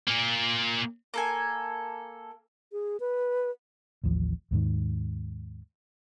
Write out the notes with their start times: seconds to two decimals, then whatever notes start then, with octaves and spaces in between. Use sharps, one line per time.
0.07 A#2 A#3
1.14 A#3 A4 G#5
2.72 G#4
3.00 B4
4.04 A1 D#2 F3
4.51 D#2 G#2 D#3